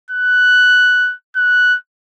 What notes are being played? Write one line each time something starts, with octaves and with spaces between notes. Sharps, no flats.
F#6
F#6